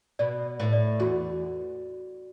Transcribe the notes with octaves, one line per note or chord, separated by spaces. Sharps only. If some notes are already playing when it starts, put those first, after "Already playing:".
B2 D5
A2
D5
E2 F#4